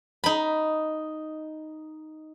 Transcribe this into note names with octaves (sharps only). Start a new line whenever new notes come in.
D#4 B5